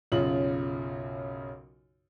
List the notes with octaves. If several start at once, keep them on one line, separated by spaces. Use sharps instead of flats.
B1 F#2 C#3 F4 F#7